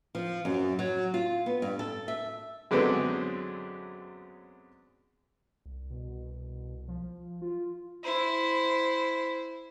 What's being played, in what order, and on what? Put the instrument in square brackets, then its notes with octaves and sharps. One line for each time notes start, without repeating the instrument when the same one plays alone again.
[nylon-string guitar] F3
F#2
F#3
F4
B3
G2
A4
E5
[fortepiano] F#2 D3 F#3 G#3 B3 C4
[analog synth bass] C2
[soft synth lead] B2
F3
F4
[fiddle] E4 C5